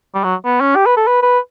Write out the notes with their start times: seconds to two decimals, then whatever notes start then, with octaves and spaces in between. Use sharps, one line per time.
0.14 G3
0.24 F#3
0.45 B3
0.60 C#4
0.76 G4
0.86 B4
0.97 A4
1.07 B4
1.22 B4